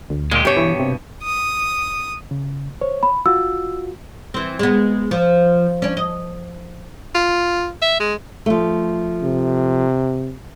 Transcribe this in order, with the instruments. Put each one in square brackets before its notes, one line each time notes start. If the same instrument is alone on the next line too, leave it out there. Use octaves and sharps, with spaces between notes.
[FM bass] D2
[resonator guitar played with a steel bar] A#2 [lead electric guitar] G#3 G4
[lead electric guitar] G2 B2 [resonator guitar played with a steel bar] G4 C#5
[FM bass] E3
C3
[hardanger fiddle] D#6
[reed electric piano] C#3
[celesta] C5 [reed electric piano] C#5
[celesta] B5
[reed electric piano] F4 F#4 [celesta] E6
[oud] E3 C4
G#3 B3
F3
C#4 D4
D#5
[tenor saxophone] F4
E5
G#3
[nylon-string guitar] F3 A3
[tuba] C3